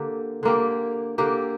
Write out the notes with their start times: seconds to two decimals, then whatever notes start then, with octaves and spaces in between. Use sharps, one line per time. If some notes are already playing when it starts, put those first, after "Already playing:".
Already playing: D3 A#3 G4
0.43 D3 A#3 G4
1.18 D3 A#3 G4